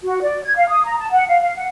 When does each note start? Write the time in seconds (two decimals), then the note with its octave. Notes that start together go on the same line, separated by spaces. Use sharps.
0.04 F#4
0.22 D5
0.44 G#6
0.56 F5
0.69 D#6
0.85 A#5
0.99 A5
1.11 F#5
1.27 F5
1.41 F5
1.56 F#5